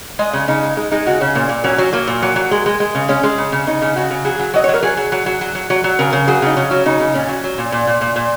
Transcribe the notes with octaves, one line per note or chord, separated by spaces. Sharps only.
G#3 D#5
C#3
C#3 D#4
G#3
G#3 D#4
G#3 D#4
C#3 F#4
C#3 C#4
A#2 A#3
A#2
F#3 C#4
F#3
F#3 A#3
A#2
F#3
F#3
G#3
G#3
G#3
C#3
G#3 C#4
G#3
C#3
C#3
C#3 D#4
C#3
C#3 F#4
C#3
F#3 G#4
F#3
F#3 D#5
C#5
F#3
A#4
F#3 G#4
F#3
F#3
F#3
F#3
F#3
F#3
F#3
C#3 A#4
C#3
F#3 G#4
C#3 D#4
C#3 C#4
F#3
C#3 D#4
C#3
A#2 C#4
F#3
F#3
A#2
A#2
A#2
A#2
A#2